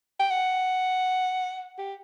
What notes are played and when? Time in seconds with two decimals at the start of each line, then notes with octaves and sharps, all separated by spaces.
0.20 G5
0.31 F#5
1.78 G4